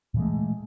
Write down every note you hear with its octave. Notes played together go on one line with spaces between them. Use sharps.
A#2 E3 G#3 A3